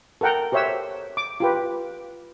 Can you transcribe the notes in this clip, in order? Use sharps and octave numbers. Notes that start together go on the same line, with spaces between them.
A4 A#4 F#5 G5 A#5
G4 C5 C#5 E5 F#5 E6
D6
F4 G4 B4